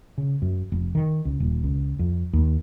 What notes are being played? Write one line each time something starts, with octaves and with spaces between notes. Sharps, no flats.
C#3
F#2
F1
D#3
C#2
D#1
C#2
F2
D#2